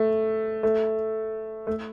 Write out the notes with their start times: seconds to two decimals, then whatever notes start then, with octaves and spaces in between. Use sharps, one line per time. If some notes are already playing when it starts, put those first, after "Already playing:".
Already playing: A3
0.63 A3
1.67 A3